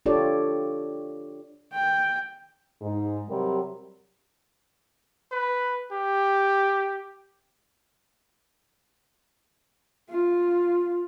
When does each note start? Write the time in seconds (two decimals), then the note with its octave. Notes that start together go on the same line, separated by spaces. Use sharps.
0.06 D4 F4 G4 A4 C#5 D5
1.74 G5
2.81 G#2
3.29 C3 F#3 G3 A#4
5.32 B4
5.92 G4
10.09 F4